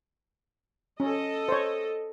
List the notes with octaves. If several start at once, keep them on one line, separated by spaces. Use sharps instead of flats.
C#4 A4 D#5
C5 C#5